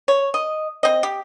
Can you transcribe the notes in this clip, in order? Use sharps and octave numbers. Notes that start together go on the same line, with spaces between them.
C#5
D#5
C4 D#5
G4